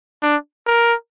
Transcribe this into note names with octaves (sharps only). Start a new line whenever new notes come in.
D4
A#4